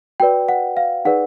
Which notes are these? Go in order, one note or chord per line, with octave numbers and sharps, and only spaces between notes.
F#4 B4 D5 G5
F#5
F5
D#4 G#4 B4 D5 F#5